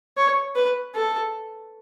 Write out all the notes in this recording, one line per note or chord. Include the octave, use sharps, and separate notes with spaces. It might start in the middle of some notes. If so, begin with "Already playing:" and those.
C#5
B4
A4